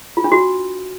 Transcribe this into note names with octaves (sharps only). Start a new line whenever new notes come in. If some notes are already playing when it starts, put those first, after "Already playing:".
F4
D4
F#4